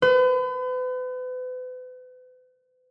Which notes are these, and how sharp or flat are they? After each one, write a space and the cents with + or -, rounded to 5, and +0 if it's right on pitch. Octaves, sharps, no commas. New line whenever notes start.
B4 +40